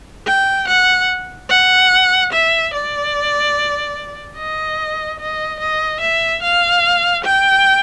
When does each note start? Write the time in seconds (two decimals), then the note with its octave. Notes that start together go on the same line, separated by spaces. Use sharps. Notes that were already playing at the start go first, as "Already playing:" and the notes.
0.27 G5
0.68 F#5
1.49 F#5
2.32 E5
2.74 D5
4.37 D#5
5.20 D#5
5.60 D#5
6.01 E5
6.42 F5
7.24 G5